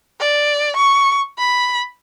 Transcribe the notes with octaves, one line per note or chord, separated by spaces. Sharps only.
D5
C#6
B5